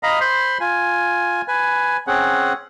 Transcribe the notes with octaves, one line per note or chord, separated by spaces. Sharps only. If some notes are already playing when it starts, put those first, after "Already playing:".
D#5 F5 A#5 B5
C5 B5 C6
F4 G#5
B4 G#5
C4 C#4 G#4 F#5